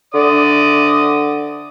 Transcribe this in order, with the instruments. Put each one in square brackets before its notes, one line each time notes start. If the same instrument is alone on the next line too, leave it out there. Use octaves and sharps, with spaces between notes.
[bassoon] D3 [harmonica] D5 D#6